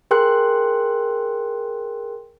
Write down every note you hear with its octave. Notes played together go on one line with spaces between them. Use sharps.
G#4 A#4 G5 C6 F#6